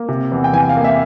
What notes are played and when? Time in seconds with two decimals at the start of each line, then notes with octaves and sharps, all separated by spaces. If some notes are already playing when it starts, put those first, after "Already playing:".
Already playing: A#3
0.09 C3
0.32 E2
0.44 G5
0.53 E3 G#5
0.69 F5
0.77 A#3
0.84 E5